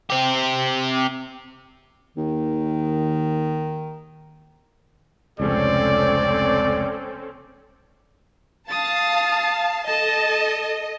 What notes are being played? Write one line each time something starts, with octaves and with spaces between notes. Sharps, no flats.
C4 G4
D#2 D#3
F1 C#2 C4 C#4 A4 D5
F5 A5 D#6 A6
A4 D#5 A5